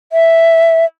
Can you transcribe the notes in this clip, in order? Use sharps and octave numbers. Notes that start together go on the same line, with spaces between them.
E5